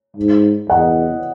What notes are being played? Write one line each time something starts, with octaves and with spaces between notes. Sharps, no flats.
G#2
E2 D#5 F#5